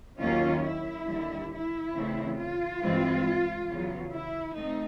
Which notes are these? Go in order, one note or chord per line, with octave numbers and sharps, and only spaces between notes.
D#2 D#3 F#3 A#3 C#4 F4
E4
D#2 D3 G3
E4
E2 C#3 E3 A3 C4
F4
G2 E3 G#3 C4
E2 C#3 F#3
E4
A3 C4 D#4